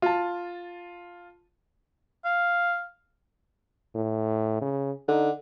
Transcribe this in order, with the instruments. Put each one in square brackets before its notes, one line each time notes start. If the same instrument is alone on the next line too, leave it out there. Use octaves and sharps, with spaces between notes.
[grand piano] F4 A5
[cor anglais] F5
[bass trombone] A2
C#3
[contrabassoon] D3 [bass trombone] D#4